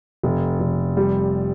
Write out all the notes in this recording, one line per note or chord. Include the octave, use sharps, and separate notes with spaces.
F1
F1
G3